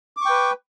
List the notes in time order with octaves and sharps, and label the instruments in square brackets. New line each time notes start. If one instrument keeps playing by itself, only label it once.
[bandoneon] D6
C#6
G5
B4